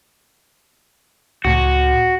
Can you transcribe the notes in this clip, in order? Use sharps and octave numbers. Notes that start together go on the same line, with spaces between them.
C#2 A2 F#4